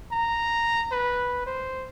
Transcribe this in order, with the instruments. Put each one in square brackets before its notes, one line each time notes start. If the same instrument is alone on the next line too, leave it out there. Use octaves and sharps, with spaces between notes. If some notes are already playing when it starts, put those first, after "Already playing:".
[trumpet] A#5
B4
C5